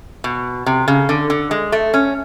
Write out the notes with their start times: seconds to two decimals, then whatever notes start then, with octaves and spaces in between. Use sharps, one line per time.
0.24 B2
0.66 C3
0.88 C#3
1.09 D3
1.30 D3
1.51 G#3
1.72 A3
1.94 C#4